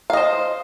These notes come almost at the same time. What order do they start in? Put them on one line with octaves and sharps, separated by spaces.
F5 D#5 C5